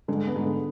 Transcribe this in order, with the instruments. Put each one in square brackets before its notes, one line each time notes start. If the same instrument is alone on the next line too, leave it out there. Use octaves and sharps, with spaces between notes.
[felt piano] G#2 G#3 [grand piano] D3
[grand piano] B3
[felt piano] G#2 G#3
[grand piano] D3